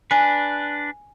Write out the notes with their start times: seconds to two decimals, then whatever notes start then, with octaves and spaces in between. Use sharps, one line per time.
0.11 D4 B4 G#5